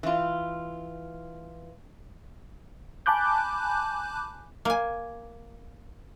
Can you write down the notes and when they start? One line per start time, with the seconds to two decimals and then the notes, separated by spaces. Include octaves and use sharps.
0.03 E3 F4
3.06 G#5 A5 B5 D6 F#6 G6
4.65 A#3 G#5